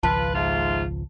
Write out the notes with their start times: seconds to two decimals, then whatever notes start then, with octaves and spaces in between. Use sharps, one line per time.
0.03 G#1 C#2 F3 F4 B4 A5
0.35 G#2 A3 F4